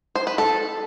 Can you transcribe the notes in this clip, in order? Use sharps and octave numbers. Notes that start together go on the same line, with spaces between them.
C5
B4
A4